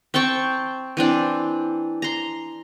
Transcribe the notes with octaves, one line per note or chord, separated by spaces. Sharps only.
C4 G5 A5 C#6
E3 C4 D4
A#5 C6